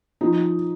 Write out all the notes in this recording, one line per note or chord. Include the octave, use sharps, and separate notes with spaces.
F3 D#4